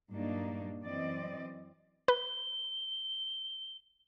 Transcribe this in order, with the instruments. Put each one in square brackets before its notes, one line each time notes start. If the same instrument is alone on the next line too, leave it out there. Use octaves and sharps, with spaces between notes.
[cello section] G2 A#2 F#3 A#3 D4 D#4
F#2 E3 C4 D5 D#5
[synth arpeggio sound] B4 [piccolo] G7